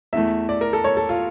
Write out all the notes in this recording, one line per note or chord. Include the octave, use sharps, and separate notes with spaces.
E2 E3 A3 E5
D5
A#4
A4
C#5
A4
F4